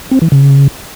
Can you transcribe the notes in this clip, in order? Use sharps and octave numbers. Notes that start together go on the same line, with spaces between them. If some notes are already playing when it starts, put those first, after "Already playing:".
C4
E3
C#3